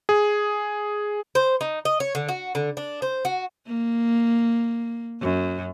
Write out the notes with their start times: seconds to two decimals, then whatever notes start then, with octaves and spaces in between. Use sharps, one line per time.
0.09 G#4
1.35 C5
1.61 D#4
1.85 D#5
2.00 C#5
2.15 D3
2.28 F#4
2.55 D3
2.77 D4
3.02 C5
3.25 F#4
3.67 A#3
5.21 F#2